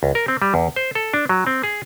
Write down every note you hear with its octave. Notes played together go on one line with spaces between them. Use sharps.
C#2
A#4
C4
G3
E2
C5
A4
D4
F#3
C4
G#4